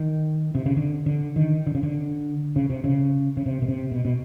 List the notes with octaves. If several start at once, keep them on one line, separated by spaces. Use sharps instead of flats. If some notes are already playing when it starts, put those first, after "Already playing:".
Already playing: D#3
C3
C#3
D3
D3
D#3
D3
C#3
D3
C#3
C3
C#3
C#3
C3
B2
C3
B2
B2